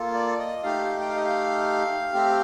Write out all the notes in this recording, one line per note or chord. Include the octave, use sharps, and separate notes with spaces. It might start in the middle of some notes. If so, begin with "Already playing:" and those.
Already playing: A#3 F4 A4
D5
D#5
A3 D#4 G4 F5
G5
F5
D#5
F5
A3 C4 G4